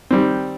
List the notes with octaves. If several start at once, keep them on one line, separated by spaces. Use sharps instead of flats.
D#3 G3 C4